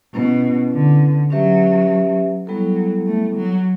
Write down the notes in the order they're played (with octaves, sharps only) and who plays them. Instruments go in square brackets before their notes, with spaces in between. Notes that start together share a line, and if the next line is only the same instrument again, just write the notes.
[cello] B2 [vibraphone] C#4 E4 B4
[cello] D3
[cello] F#3 [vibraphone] C#4 G4 B4 E5
[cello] F#3 [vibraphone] G3 B3 E4 A4
[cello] A3
F#3